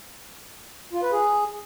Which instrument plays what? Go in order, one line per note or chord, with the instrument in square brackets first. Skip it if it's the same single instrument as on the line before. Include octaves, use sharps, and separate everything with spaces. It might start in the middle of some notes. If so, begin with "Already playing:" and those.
[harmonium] F4
B4
G#4